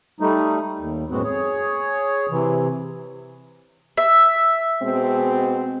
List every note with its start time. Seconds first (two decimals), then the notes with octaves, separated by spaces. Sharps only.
0.20 G3 A3 D#4
0.79 D#2
1.10 F#2 A2 G#3 B3 C4 F#4
1.23 G#4 C#5
2.30 C3 E3
3.97 E5
4.81 B2 G#3 C4